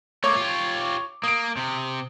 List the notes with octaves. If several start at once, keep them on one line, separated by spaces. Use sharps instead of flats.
A3 A#3 C#5 D6
F4 G4
A#3 D#6 D7
C3